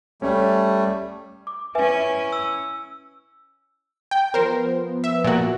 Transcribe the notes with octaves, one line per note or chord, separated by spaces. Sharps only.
G3 A3 C#4
D6
C#4 E4 B4 E5 G#5
E6
G5
F3 B3 A#4 C5
E5
A#2 F#4